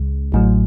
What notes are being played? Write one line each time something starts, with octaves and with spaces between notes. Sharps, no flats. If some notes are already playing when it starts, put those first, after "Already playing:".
Already playing: C#2 C#3 G#3
A1 A2 F#3